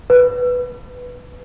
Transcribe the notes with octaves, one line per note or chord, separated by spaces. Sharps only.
B4